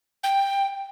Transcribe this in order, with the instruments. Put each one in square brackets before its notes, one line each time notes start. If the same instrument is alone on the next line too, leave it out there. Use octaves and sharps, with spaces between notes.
[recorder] G5